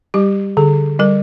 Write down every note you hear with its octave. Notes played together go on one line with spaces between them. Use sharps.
G3 G4
D3 G#4
G3 A#4